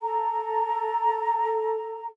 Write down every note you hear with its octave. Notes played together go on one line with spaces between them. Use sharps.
A4 A#5